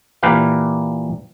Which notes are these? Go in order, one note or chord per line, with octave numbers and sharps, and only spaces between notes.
A#2 E3 G4 A#4 B4 F5